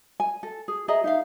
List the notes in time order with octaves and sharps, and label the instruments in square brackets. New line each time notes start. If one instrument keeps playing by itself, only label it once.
[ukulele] G#5
A4
G#4
G#4 D#5 E5 A#5
D#4 E5 F5